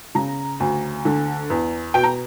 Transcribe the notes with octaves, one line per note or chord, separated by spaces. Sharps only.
C#3 A#5
D2
D3
E2
B2 G5
A#5